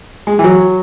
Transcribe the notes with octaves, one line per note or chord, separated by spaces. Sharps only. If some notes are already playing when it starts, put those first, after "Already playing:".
G#3
E3
F#3